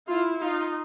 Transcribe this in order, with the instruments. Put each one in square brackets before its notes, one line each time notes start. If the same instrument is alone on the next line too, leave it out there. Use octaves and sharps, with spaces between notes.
[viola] E4 [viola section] F4
[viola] D#4 [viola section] F4